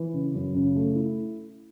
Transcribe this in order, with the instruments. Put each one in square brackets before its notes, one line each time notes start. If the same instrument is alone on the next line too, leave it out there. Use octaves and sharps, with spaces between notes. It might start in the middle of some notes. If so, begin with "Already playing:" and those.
Already playing: [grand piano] E3
C#3
F#2
C#3
A3
E4